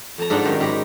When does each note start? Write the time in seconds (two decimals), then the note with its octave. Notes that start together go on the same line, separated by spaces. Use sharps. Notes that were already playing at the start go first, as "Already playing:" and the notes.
0.18 F2 A5 A#5
0.30 G#2 D4 D#4 F4 F#5 G5
0.44 F#2 D#3 G5
0.60 G#2 G4 A#5 B5